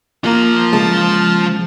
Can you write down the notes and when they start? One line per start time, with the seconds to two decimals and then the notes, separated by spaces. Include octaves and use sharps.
0.24 F3 A#3 F4
0.73 C#3 G#3 A5